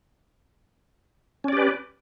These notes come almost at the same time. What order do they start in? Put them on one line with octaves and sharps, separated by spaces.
C#4 D5 G4 B4